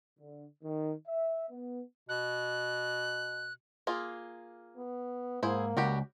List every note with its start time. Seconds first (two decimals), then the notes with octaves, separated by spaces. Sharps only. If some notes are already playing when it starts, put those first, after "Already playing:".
0.19 D3
0.64 D#3
1.08 E5
1.50 B3
2.09 B2 F#6
3.87 A#3 F4 G#4
4.77 B3
5.43 G#2 A#3 E4 G#4 C5
5.77 C#2 G3 F#4 G4